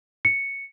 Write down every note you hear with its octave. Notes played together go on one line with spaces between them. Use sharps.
C#7